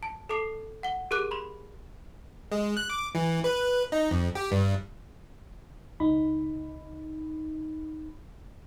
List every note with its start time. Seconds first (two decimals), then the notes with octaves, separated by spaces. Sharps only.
0.03 A5
0.29 A4 A5 D6 C7 F7
0.83 F#5 G7
1.11 G4 G#4 A#4 D6 F#6 D#7
1.31 B5 C6
2.52 G#3
2.77 F#6
2.90 D6
3.15 E3
3.44 B4
3.92 D#4
4.11 F2
4.35 G4
4.51 G2
6.00 C#2 D#4 B5